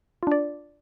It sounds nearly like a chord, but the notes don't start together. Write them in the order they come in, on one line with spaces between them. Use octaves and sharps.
F4 D4 D5